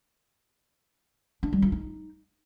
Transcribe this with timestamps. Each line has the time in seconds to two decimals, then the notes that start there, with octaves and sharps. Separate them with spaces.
1.43 D4
1.53 G3
1.62 F4
1.72 D#4